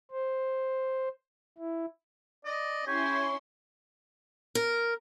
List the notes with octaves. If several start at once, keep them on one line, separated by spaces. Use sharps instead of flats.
C5
E4
D5 D#5
C#4 E4 G4 G#5 C6 C#6
A#4